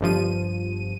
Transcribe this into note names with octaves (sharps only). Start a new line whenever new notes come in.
G1 G2 F3 D#7